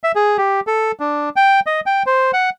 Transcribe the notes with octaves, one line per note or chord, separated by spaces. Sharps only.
E5
G#4
G4
A4
D4
G5
D#5
G5
C5
F#5